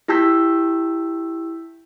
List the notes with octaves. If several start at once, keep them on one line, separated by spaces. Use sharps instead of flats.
E4 G4 A5 E6 G6 B6